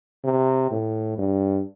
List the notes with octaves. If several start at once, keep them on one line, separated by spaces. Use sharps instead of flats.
C3
A2
G2